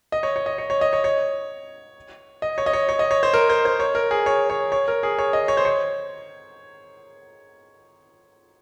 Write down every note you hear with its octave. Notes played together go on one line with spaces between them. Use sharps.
D#5
C#5
C#5
D#5
C#5
C#5
D#5
C#5
C#5
D#5
C#5
D#5
C#5
C#5
D#5
C#5
C5
A#4
C5
C5
C#5
A#4
G#4
C#5
C#5
C#5
A#4
G#4
C#5
D#5
C#5
C5
C#5